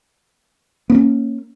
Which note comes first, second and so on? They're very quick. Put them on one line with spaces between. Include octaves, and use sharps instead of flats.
B3 A#3 C#4